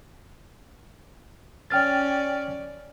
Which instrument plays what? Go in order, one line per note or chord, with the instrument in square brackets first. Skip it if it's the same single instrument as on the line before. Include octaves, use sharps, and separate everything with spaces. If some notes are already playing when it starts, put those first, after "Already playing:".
[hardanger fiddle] C#4 D5 [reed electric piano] G5 F6 A6